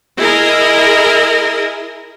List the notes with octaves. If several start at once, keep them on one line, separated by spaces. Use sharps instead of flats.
E4 G#4 A#4 D#5